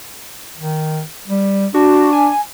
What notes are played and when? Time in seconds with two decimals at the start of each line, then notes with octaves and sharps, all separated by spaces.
0.58 D#3
1.27 G3
1.74 D4 F#4
2.13 G#5